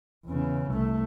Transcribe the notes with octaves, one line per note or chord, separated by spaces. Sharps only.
E2 C#3
C2 A3